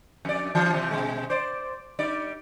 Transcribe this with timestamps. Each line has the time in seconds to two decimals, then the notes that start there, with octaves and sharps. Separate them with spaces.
0.25 F2 D5
0.55 E3
0.73 C3 E3 G3
0.91 B2 G#3
1.30 C5 D5
1.99 G3 D#4 D5